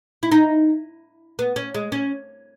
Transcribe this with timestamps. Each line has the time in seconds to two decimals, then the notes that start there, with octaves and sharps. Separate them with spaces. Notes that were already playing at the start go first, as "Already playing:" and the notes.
0.23 E4
0.32 D#4
1.39 B3
1.56 C#4
1.74 G#3
1.92 C#4